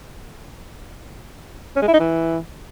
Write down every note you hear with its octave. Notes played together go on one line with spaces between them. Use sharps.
C#4
G#3
E4
D#4
E3